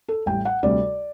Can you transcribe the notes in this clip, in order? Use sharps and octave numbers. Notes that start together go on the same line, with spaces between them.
A4
A1 A2 G3 G5
F#5
D2 C3 G3 D5